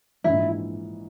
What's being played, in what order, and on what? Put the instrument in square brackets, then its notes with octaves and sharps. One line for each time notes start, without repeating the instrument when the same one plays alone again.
[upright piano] A#1 G#2 E3 [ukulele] E4